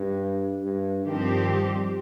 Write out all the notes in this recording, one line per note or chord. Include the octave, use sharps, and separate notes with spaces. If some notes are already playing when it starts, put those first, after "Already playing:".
Already playing: G2
G2
G2 D#3 F3 C4 G4
G3